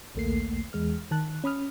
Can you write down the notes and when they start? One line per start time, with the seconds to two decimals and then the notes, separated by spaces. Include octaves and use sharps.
0.15 A#1 D#2 A3 A#3 C7
0.73 E2 G#3 F6
1.11 D#3 A5 F#6
1.44 C#4 B5 D#6 F6